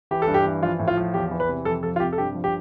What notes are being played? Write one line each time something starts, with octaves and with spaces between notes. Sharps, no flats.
E3 G4
A4
G2
G4
E3
F3 F4
A2
F4
F3
E2 G4
E3
B4
C3
F2 A4
F3 A4
F4
C3 G4
A4
G2 G4
F3
G4